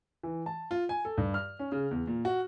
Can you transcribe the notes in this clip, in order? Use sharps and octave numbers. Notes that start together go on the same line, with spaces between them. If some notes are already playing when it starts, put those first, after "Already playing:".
E3
A5
F4
G#5
A4
G2
F6
C#4
C#3
E2
A#2
F#4